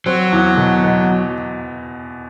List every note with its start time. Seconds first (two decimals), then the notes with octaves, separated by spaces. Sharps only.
0.06 F#3 C4
0.32 E2
0.57 B2
0.84 B2